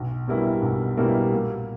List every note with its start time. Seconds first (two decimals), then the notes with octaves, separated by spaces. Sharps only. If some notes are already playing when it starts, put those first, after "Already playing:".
Already playing: B1
0.28 B2 G3 A#3 E4
0.62 B1
0.97 B2 G3 A#3 E4
1.32 A#2